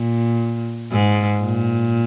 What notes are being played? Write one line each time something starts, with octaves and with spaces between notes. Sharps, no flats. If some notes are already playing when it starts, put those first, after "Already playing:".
Already playing: A#2
G#2
A#2